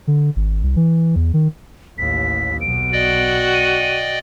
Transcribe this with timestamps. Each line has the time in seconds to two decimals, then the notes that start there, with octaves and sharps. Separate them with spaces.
0.07 D3
0.36 G#1
0.63 C2
0.76 E3
1.16 E2
1.34 D#3
1.98 A1 D#2 B6
2.61 B1 B2 D7
2.92 F#4 D5 D#5 G5
3.54 D#7